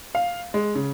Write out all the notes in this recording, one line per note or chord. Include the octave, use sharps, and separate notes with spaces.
F5
G#3
C#3